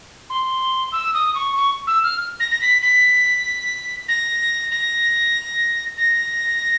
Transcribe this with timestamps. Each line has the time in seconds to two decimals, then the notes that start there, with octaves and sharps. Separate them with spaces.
0.30 C6
0.92 E6
1.14 D#6
1.35 C#6
1.56 C#6
1.87 E6
2.03 F6
2.40 A#6
2.51 A#6
2.61 B6
2.82 B6
4.08 A#6
4.71 A#6
5.98 A#6